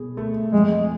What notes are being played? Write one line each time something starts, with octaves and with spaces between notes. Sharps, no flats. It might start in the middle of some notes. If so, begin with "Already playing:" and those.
Already playing: B2 G#4
A3
F2 G#3